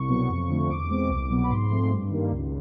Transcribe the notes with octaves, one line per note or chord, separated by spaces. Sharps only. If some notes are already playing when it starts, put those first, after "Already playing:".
Already playing: C2 C#6
B2 F#3 B3
F2
D3 F3 A3
E2 D6
B2 G#3 C4
C2
B2 F#3 B3
B5
G#2 C6
F3 A3 C4
G2
D#3 G3 A#3
C#2